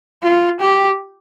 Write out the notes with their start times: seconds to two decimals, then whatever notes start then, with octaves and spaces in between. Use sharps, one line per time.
0.23 F4
0.60 G4